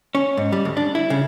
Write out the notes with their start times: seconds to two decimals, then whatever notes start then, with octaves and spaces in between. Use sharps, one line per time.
0.15 C#4
0.37 G#2
0.52 G3
0.65 D2
0.77 D4
0.95 E4
1.10 C#3